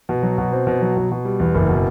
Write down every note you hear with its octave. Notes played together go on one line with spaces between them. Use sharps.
B2
F#3
B2
C4
B2
F#3
B2
B2
G3
E2
F#1
B2